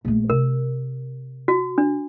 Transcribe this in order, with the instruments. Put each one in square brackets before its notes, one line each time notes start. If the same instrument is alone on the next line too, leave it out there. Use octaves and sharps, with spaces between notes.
[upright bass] A#1 A3
[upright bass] C3 [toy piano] A#4
[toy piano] F#4
D4